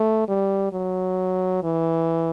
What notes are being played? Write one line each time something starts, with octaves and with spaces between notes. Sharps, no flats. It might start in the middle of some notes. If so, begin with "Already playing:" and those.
Already playing: A3
G3
F#3
E3